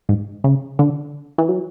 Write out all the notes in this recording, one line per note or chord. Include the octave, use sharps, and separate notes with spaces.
G#2
C#3
D3
E3
F#3